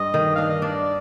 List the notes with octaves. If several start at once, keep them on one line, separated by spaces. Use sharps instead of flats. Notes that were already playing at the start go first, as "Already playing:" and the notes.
Already playing: G2 D#5
D#3
D4 F5
D#5
D4 D5